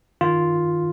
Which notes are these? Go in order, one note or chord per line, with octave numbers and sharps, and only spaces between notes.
D#3 F4